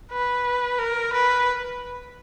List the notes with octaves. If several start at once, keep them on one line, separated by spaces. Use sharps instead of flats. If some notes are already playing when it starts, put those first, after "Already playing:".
B4
A#4
B4